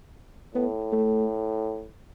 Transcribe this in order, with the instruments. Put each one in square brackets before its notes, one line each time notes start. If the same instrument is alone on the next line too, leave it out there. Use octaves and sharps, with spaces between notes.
[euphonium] A2 [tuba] B3
[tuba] A3